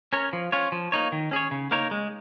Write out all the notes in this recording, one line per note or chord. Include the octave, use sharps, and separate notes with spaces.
C#4 A#4 C#5
F3
C#4 F4 C#5
F3
A#3 D#4 C#5
D#3
C#4 G#4 C#5
C#3
A#3 D#4 A#4 C#5
G#3